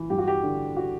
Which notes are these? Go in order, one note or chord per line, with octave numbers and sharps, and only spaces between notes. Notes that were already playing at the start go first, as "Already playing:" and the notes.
Already playing: E3
G2 G4
F#4
G4
D3
F#4